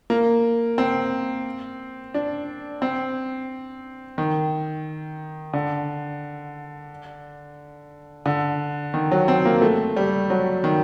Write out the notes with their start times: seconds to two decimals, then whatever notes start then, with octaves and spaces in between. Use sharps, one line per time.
0.10 A#3
0.78 C4
2.14 D4
2.82 C4
4.18 D#3
5.54 D3
8.26 D3
8.94 D#3
9.11 F#3
9.28 C4
9.46 A#3
9.62 A3
9.96 G3
10.30 F#3
10.64 D#3